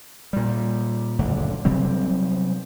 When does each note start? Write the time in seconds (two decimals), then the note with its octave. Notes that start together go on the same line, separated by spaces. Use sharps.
0.33 A#2 G3
1.19 F#1 D2 A#2 D3
1.65 C3 F#3 G3 C4